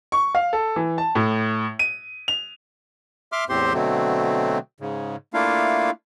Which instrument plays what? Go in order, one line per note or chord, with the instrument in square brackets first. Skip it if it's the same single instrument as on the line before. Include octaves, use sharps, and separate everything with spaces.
[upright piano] C#6
F5
A4
E3
A5
A2
D#7
F7
[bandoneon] E5 C6 D6 F6
E2 A2 C4 G4 C5 C6
B2 D3 F#3 A3 C4
G#2 C#3
A3 A#3 D4 E4 F4 F5